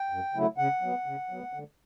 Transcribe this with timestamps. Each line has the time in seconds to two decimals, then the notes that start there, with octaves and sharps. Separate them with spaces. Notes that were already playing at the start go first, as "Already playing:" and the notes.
Already playing: G5
0.10 F#2
0.34 C#3 F#3 A3 E4
0.58 C#3 F#5
0.81 F#3 B3
1.06 C#3
1.30 F#3 B3
1.53 D3